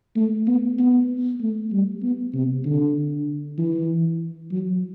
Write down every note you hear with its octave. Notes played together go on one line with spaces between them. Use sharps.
A3
B3
B3
A3
G3
B3
C3
D3
E3
F#3